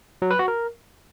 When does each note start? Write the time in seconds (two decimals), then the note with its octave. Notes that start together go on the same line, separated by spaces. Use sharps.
0.22 F#3
0.31 B4
0.39 F#4
0.48 A#4